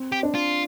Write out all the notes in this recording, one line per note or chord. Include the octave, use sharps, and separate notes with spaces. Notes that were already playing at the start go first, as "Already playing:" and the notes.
Already playing: C4
G4
D4
F4